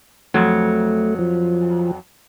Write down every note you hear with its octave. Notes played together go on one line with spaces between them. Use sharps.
F2 F#3 A3
F3